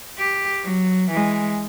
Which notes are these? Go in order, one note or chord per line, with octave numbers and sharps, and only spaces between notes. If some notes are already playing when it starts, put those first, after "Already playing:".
G4
F#3
E3 G#3